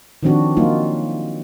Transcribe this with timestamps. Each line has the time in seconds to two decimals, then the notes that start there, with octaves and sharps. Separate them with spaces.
0.23 D#3 F3 C4 D4 F#4
0.57 F#3 A#3 D#4 F4